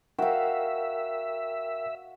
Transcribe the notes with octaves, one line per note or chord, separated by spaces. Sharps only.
F#4 A#4 E5 F5 G5